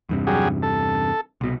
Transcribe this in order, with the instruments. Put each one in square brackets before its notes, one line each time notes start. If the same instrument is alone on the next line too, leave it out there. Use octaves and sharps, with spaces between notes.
[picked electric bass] E2 G2 C3
[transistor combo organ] F#3 G3 G#4
A4
[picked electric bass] C2 B2